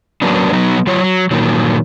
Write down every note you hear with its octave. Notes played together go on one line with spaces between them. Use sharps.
F#3 A#3 B3 C#4 D4
F#3 B3 D#4
F#3 F4 C#5
F#3
A#2 D#3 F#3